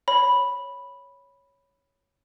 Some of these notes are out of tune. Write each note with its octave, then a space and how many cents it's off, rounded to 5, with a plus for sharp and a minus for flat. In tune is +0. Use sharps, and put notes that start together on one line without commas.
C#5 +0 B5 -5